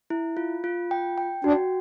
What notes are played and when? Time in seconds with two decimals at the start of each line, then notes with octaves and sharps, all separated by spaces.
0.10 E4
0.37 F4
0.64 F4
0.91 G5
1.18 G5
1.44 D4 F#4